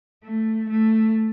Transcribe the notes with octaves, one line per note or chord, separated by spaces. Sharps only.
A3
A3